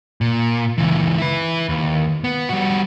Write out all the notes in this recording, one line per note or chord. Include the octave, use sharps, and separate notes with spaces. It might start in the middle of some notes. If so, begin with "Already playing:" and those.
A#2
C#2 E3
E4 B4
D#2
B3
G3 F#4